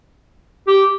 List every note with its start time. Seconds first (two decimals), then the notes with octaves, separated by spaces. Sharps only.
0.68 G4